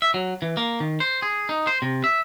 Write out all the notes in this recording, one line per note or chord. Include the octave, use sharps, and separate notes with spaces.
E5
F#3
E3
A#3
D#3
C5
G#4
D#4
C5
C3
E5